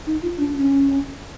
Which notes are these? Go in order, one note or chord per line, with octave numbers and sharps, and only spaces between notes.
D#4
F4
D4
C#4